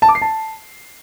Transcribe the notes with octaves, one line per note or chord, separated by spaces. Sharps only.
A5
D6
C7
A5